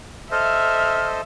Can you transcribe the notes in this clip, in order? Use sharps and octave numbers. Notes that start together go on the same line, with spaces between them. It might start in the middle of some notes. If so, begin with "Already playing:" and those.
A4 C5 D#5 E5 F6